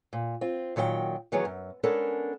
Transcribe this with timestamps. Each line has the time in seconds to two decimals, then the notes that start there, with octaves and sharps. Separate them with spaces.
0.13 A#2
0.41 C4 F4
0.76 A#2 D#3 F#3 B4 G5
1.32 D#3 E3 F#3 B3 G#4 C#5
1.45 F#2
1.83 G#3 B3 C#4 D4 A4 A#4